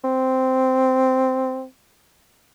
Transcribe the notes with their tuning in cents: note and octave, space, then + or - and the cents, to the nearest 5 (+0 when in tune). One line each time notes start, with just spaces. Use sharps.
C4 -5